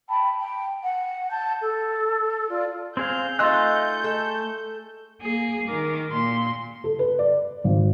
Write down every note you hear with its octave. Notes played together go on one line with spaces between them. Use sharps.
G5 A5 B5
G5
F#5
A5 G6
A4
F4 D5
C4 G#4 F5 G6
A3 D#4 F4 G#5 C6 E6 F#6 A6
A4
A#3 G#4
D#3 A#4 D6
A#2 C6
A4
B4
D5
G#1